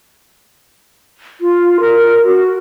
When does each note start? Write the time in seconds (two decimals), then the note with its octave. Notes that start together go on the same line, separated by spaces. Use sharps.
1.41 F4
1.80 A#4
2.24 F#4